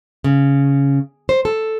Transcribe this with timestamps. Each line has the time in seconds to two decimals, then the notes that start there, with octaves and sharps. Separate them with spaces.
0.24 C#3
1.29 C5
1.45 A4